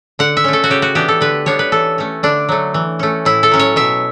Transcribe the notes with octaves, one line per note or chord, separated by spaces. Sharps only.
D3 F#5
E5
A3 C#4
A4
F#4
C#3 G4
F#4
E3 B3 D4 G4
A4
D3 B4
G3 B3 D4 C#5
B4
E3 A4
A3 C#4
D3 D4
F#3 A3
E3
A3 C#4
A2 E4
A4
F#3 C#4
C#5
B2 E5